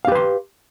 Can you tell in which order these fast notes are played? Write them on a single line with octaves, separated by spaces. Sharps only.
F5 G4 B4 C6